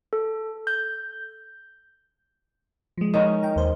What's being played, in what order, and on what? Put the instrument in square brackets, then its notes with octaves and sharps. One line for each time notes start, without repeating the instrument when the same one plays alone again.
[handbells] A4
G6
[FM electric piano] F3 G#3
[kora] D#3 C#4 D#4
[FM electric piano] G5 A#5
D#2 C5